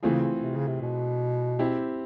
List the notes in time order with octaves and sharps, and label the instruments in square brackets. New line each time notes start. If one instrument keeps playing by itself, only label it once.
[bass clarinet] C#3 [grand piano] E3 A3 C4 F4 G#4
[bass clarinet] C3
C#3
C3
B2
[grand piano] C4 E4 G4